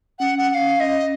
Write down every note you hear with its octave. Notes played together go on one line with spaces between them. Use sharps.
C#4 F#5
F#5
F#5
F5
D#5